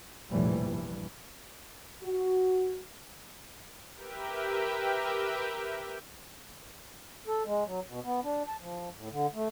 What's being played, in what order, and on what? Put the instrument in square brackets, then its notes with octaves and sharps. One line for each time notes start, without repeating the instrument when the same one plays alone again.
[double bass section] A#1 E2 A2 C3 E3 G3
G2 E3
[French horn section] F#4
[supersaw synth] G4 A#4 B4 E5 G5
[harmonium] A4
G#3
F#3
B2
B3
D4
A5
F3
A2
D3
A3